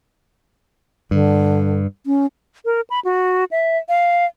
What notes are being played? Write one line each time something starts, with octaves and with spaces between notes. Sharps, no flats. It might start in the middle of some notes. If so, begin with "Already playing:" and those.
G2 D3
C#4
A#4
B5
F#4
E5
F5